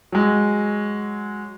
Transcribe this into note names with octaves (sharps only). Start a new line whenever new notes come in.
F#3 G#3